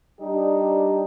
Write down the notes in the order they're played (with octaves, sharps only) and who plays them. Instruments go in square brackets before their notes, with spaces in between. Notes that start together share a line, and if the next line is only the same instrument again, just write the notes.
[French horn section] G3 D4 D#4 G4